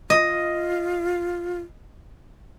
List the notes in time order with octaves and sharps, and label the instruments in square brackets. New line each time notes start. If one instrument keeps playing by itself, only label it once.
[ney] F4 [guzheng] D#5